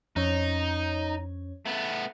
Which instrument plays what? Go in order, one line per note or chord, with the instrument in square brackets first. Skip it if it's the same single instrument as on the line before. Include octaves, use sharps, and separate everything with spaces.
[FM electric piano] F2 C#4 C#5 [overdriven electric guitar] D#4
[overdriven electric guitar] A3 B3